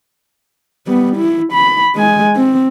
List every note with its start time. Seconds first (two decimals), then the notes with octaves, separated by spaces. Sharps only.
0.87 G3 B3
1.17 E4
1.53 B5
1.96 G#3 G#5
2.36 C4